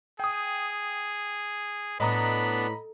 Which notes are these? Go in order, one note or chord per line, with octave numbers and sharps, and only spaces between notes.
G#4 G5 D#6
A2 B3 D4 D#5 A#5 B5 D#6